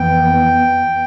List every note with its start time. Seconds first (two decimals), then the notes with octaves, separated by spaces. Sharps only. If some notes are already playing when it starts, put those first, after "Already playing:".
Already playing: F2 E3 B3 G5